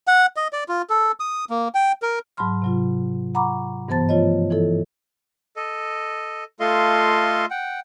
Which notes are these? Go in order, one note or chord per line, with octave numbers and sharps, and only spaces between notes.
F#5
D#5
D5
F4
A4
D#6
A#3
G5
A#4
G#2 F#3 A5 B5 C6 F6
C3 F#3 F4
F#5 A#5 B5 C#6 D6
G2 E3 B3 C5 A5 A6
F3 A3 F4 C#5 D#5
E3 E4 A4
A4 D#5
A3 F4 A4 D#5 F5 C6
F#5 G5